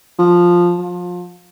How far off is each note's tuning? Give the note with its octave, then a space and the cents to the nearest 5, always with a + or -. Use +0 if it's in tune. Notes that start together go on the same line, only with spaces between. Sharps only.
F3 +5
F3 +25